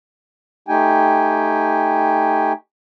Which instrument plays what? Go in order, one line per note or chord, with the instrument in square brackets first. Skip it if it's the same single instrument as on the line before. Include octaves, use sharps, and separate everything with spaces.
[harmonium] A3 D#4 G4 G5 G#5